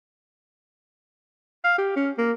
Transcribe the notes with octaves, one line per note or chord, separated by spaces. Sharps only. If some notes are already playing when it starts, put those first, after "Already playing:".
F5
G4
C#4
A#3